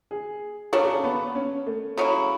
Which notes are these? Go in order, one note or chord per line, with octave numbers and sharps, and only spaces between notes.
G#4
C#3 F#3 A3 D4 A4
G#4
C#4
B3
C#4
A3
C#3 F#3 C#4 E4